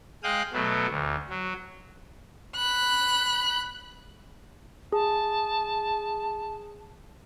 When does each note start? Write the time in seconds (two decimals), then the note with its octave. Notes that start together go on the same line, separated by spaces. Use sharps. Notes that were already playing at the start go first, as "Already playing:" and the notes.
0.23 G#3 F5 G5 D#6 F#6
0.53 B2 F#3 A3
0.89 D2
1.30 F#3
2.56 B5 F#6
4.92 G#4 A5